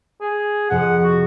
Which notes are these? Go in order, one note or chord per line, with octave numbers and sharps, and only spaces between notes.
G#4
F2 C3 G#4 F#5
F#4